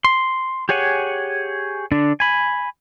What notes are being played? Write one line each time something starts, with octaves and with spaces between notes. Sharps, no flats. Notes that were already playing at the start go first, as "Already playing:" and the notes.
C6
G4 G#4 C#5 F#5 G#5
D3 D4
G#5 B5